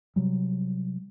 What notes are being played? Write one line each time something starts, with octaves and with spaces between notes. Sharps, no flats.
C3 F#3 G3